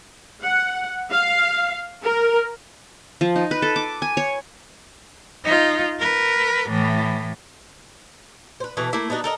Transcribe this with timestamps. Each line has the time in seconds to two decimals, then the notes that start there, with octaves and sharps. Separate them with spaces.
0.43 F#5
1.11 F5
2.04 A#4
3.21 F3
3.36 D#4
3.51 B4
3.62 A4
3.76 D6
4.02 G#5
4.17 C#5
5.44 D#4 F4
5.99 A#4 B4
6.69 A2 E3
8.60 B4 C5
8.77 B2 E3 A4
8.93 A3 A#3 E4
9.10 B3 D4 D#4 F#4
9.24 A4 A#4 D#5